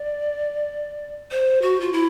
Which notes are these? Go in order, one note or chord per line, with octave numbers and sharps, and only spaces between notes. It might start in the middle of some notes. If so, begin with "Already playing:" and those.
Already playing: D5
C5
F#4
F4
E4